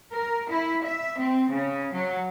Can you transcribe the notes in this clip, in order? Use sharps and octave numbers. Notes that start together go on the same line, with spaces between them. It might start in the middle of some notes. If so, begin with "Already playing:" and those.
A#4
E4
E5
C4
C#3
F#3